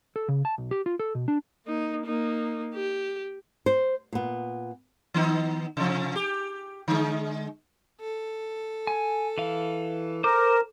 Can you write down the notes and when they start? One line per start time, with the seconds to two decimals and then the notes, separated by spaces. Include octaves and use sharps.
0.16 A4
0.28 C#3
0.45 A5
0.58 B1
0.71 G4
0.86 F4
0.99 A4
1.15 B2
1.28 D4
1.66 A#3 D#4
2.06 A#3 D#4
2.74 G4
3.66 C5
4.13 A#2 B3
5.14 D#3 B3 D#4
5.77 C3 F3
6.16 G4
6.88 D3 G#3
8.00 A4
8.87 G#5
9.38 E3 F5
10.24 A#4 C5 D6